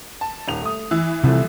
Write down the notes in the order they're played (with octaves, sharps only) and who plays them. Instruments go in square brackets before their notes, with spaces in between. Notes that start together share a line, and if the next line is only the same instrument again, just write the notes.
[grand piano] A5
D#1 D#3 F7
A3 D#6
[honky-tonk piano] E3 [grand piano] E6
[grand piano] C2 F3 A3 [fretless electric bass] C3